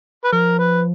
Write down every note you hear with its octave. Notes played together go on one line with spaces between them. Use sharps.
B4
F3 A#4
B4